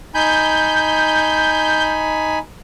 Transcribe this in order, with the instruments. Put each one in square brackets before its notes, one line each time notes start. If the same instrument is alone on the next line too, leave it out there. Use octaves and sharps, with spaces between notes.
[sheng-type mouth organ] D#4 G#5 B5 [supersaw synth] G6